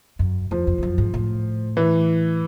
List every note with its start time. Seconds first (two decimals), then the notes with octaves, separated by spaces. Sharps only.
0.19 F#2
0.51 F2 F3
0.67 F2
0.78 F2
0.83 F#2
0.98 G#2
1.14 A2
1.77 E3